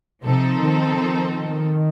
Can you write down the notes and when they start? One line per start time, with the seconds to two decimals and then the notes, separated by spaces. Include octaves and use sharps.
0.25 C3 F3 C4 D#4 A4
0.60 D#3
0.95 D#3